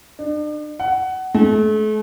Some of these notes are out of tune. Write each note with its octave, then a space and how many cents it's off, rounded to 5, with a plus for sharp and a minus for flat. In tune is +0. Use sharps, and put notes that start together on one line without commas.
D4 +40
F#5 +20
A3 -40